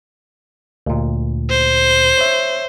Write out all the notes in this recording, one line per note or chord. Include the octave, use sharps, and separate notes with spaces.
D2 A#2
C5
C#5 E5